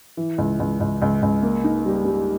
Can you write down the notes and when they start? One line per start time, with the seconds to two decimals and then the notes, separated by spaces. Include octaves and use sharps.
0.17 E3
0.38 C#2
0.60 C#2
0.80 C#2
1.02 C#2
1.22 C#2
1.43 A#3
1.64 D#4
1.85 G3
2.05 G3